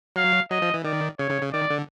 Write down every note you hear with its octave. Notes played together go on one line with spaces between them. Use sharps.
F#3 F5
F#3 D#5
F3
E3
D#3 D5
C#3 C#5
C#3
C#3
D#3 D5
D3